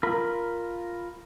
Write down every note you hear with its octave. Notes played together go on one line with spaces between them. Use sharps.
F4 A#4 B5